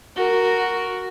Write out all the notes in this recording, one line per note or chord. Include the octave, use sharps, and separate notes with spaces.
F#4 A#4